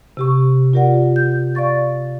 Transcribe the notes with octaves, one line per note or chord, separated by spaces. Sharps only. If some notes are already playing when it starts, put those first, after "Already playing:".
C3 G4 C#6
F4 G4 A#4 D5 F#5
G6
D5 F5 C#6 A6